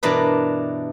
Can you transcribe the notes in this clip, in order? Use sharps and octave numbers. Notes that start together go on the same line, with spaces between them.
G2 B2 E3 D4 A#4 B4